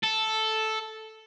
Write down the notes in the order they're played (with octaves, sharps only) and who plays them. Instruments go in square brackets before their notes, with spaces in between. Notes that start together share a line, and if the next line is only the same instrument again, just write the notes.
[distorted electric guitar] A4